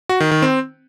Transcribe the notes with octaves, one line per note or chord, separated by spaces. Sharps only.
F#4
D#3
D#3
C4